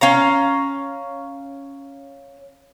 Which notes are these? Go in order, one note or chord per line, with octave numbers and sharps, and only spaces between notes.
C#4 F5 A#5